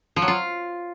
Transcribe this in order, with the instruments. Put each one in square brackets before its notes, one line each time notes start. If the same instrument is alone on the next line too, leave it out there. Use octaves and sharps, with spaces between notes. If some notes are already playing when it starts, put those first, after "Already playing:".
[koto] F3
F#3
F4